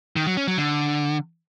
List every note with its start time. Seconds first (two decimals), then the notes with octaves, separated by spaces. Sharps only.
0.16 D#3
0.27 F#3
0.37 C#4
0.47 F#3
0.58 D3